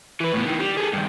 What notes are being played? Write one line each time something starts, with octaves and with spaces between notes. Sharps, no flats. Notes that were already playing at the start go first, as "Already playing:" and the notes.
E3 B4
A2 B3
D#3 E3
G3
G#4 A4
G2 D#3